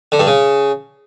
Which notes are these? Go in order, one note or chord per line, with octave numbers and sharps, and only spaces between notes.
D3
G2
C#3